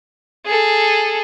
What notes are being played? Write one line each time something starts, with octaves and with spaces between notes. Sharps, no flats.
G#4 A4